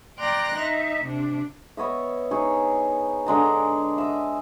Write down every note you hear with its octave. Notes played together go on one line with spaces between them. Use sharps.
D5 G5 A#5 C6 F#6 A#6
D#4 E5
C3 D4
B3 C#5 D#5 E5
D#4 G#4 C#5
D3 G#3 A#5
D6
D#5 E5